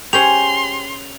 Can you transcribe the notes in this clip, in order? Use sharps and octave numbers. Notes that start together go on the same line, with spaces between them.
C#4 G4 G#4 C5 C#5 C6 F7